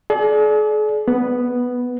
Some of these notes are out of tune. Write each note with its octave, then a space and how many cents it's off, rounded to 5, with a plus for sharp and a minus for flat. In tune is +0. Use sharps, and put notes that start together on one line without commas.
G#4 +45 D5 +0
B3 +0 B4 +0